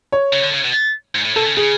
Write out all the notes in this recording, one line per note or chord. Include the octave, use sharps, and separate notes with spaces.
C#5
C#3
D3
C#3
B2
G#2
A2
B2 A4
C#3
C#3 G#4